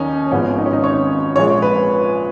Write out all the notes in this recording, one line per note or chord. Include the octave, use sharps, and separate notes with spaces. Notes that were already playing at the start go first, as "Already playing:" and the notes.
Already playing: D#2 D#3 C#4 D#4
G#1 G#2 F3 B3 C#4
D#4
C#4
D#4
C#5
A#1 A#2 G#3 C#5
B4